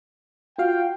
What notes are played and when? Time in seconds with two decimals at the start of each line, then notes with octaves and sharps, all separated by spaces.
0.58 F4 F#4 F5 G5